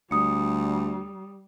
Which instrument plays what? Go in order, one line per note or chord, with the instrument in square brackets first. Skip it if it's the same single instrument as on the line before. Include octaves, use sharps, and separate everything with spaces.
[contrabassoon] D2 [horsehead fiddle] G3 [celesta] D#6 C#7